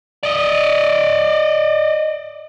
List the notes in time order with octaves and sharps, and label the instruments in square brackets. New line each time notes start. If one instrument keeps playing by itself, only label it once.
[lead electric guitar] D5 D#5